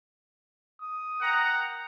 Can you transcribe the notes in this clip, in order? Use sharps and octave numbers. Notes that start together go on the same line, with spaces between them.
D#6
A#4 F#5 G5 A#5